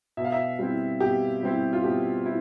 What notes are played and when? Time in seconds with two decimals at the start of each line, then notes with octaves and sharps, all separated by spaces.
0.17 B2 E5
0.24 F5
0.32 E5
0.59 G3 C4 E4
1.00 B2 G4
1.42 G3 C4 E4
1.73 F4
1.84 B2 G4
2.26 E4